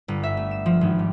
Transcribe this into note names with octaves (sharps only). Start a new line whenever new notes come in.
G1
E5
A3
E7
F3
G#1
G3